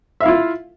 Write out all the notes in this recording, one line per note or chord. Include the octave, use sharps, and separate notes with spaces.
E4 F4 E5 F5